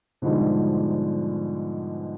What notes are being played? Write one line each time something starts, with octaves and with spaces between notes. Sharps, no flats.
G#2 B2 D3 F3 G3 G#3